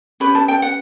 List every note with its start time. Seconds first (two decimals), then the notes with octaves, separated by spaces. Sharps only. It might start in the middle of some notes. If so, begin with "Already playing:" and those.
0.20 C#4 G4 B4 B5
0.35 A5
0.48 G5
0.62 F#5